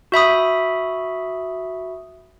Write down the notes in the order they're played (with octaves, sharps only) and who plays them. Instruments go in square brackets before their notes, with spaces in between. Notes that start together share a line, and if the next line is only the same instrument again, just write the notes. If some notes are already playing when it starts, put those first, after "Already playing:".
[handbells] F#4 E5 B5 D#6